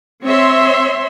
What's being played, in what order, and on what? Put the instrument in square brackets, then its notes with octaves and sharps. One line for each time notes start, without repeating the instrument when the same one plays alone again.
[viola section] C4 C#5 E5 C6